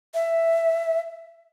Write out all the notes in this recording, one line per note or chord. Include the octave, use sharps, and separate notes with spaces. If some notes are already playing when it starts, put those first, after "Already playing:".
E5